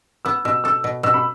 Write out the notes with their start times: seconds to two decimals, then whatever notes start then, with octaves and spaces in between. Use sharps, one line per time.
0.25 B3 E6
0.45 B2 E6
0.64 A4 E6
0.84 B2
1.03 B2 E6
1.14 B5